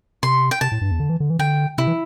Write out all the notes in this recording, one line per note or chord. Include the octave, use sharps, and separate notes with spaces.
C3 C6
G5
C3 A5
A2
G2
E2
D3
E3
D3
E3
D3 G5
C3 E4
E3